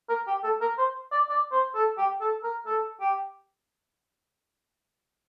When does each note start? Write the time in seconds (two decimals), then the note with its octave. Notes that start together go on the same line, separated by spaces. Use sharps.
0.09 A#4
0.27 G4
0.44 A4
0.61 A#4
0.78 C5
1.12 D5
1.29 D5
1.52 C5
1.75 A4
1.98 G4
2.21 A4
2.43 A#4
2.66 A4
3.00 G4